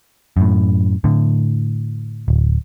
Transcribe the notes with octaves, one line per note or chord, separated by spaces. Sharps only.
F#2 A2
A2 D3
D1